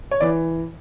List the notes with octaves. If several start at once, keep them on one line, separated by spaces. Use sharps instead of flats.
C#5
E3 D5